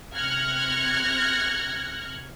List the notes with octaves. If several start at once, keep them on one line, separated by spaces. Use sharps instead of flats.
C3 F6 F#6 G#6 A#6 C#7